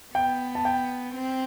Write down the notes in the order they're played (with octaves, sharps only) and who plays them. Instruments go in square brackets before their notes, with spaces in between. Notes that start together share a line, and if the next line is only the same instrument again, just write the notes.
[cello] B3 [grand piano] G5
[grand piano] A5
G5
[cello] C4